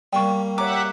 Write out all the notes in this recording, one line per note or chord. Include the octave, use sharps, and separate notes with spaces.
G3 A#3 G5 C#6
G4 C#5 E5 F#5 A#5 D6